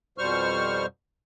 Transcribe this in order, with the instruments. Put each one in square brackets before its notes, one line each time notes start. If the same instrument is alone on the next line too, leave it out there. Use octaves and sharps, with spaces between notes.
[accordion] F2 B2 G3 C5 C#6 F6